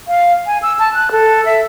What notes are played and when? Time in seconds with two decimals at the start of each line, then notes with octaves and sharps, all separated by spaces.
0.08 F5
0.46 G#5
0.62 E6
0.79 A5
0.94 F#6
1.12 A4
1.46 E5